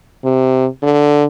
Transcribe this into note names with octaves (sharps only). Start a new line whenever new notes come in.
C3
D3